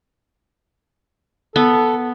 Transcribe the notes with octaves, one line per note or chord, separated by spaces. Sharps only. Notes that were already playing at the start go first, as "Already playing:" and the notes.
B3 A4